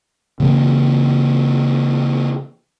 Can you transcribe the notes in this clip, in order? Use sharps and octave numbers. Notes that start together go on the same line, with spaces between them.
C#3 E3 A#3